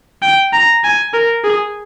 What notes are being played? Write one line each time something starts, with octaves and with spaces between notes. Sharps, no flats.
G5
A#5
G#5
A#4
G#4